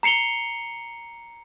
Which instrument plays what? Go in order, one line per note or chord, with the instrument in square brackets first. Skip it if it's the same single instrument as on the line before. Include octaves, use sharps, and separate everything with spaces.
[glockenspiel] A#5 C7 C#7 F7 G7